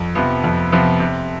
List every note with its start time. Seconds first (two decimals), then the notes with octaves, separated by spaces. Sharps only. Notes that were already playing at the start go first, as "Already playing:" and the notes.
Already playing: F2
0.15 C3 F3 B3
0.44 F2
0.72 C3 F3 B3
1.00 C3